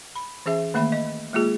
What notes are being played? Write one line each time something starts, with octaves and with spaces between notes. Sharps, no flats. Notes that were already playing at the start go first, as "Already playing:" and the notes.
B5
E3 C#4 G#4 E5
D#3 A3 A#3 E5 B5
D#5
G#3 A#3 F4 G#4